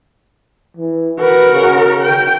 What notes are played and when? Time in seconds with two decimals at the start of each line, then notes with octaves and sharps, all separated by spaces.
0.77 E3
1.20 F#4 A#4 B4
1.53 C#3
2.02 G5